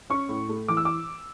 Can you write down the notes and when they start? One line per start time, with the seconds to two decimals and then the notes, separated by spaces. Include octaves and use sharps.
0.10 C#4 C#6
0.29 A2
0.49 A3
0.68 E3 D6
0.77 E6
0.85 D6